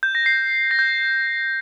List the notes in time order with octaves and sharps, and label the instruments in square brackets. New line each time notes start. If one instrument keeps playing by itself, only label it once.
[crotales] G6
A#6
C7
A#6
G6